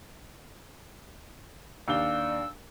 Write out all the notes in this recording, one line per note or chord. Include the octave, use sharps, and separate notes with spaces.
D#2 D4 D5 F5 E6 G7